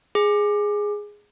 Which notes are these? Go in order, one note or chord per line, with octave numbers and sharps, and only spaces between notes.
G#4